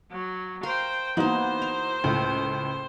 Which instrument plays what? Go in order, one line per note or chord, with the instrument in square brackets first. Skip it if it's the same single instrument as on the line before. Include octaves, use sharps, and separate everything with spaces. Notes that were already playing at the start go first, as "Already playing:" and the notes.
[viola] F#3
[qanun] A#4 F5 [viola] C5 G5
[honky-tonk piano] E3 D#4 F#4 [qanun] A#3 B3 [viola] C5
[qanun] A#4
[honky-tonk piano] C#2 A2